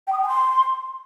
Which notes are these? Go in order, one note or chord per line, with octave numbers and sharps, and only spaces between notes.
G5
D#6
G5
G#5
C6